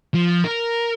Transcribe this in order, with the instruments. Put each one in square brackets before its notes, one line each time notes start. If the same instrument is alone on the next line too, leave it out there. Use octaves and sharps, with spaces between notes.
[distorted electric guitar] F3
A#4